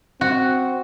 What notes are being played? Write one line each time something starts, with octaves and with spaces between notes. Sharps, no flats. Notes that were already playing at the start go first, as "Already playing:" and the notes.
C4 F#4